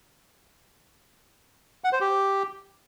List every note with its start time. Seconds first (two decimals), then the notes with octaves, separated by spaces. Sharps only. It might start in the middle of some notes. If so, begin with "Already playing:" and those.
1.84 F#5
1.92 C5
2.01 G4